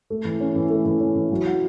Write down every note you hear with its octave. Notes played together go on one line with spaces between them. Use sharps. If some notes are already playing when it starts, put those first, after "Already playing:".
A3
E3
C#4
E3
A3
E3
C#4
E3
F#3
F#4